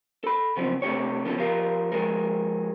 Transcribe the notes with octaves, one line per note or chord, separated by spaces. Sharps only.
A4 B5
C#3 F3 F#3 B3 C4
C3 A3 D4 G4 C#5
D3 F3 B3 C#4 A4
F3 G4 A#4 F5
F3 G#3 G#4 A#4